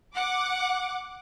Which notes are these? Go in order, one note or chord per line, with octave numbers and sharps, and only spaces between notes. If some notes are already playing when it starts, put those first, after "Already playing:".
F#5 D6